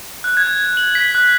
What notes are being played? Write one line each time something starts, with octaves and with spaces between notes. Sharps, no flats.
F#6
G#6
F#7
B6
F#6